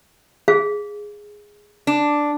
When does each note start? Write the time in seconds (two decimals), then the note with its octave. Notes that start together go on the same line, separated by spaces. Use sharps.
0.48 G#4 F5
1.87 D4